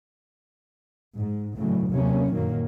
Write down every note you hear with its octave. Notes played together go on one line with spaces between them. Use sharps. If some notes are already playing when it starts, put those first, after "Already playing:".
G#2
A2 C#3 E3 F#3
D#2 C3 F#3 A#3 C#4
F#2 A#2 D#3 F#3 A#3